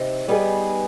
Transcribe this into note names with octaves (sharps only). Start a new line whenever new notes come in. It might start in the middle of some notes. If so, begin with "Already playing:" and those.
Already playing: C3 C4 D#4
G3 B3 D#4 G#4 B4